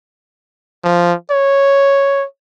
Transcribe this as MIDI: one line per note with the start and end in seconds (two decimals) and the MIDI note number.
0.84 1.13 53
1.31 2.25 73